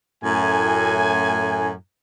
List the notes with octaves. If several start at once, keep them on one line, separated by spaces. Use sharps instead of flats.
F#2 A2 G#5